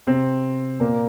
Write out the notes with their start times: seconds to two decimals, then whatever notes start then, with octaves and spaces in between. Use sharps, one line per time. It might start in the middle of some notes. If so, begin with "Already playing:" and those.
0.07 C3 C4
0.80 A#2 A#3